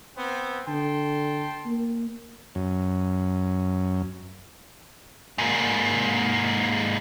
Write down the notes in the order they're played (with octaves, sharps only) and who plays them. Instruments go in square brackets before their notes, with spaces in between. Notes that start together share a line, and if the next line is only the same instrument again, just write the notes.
[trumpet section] B3 C4
[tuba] D3 [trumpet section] G5 A5 C6
[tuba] A#3
[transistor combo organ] F#2
[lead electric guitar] G#2 A#3